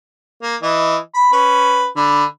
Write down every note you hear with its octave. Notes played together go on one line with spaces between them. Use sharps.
A#3
E3 D#5
B5
C#4 B4
D3 B5